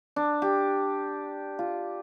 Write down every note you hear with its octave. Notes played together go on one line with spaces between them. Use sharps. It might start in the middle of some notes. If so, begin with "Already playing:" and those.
D4
G4
F4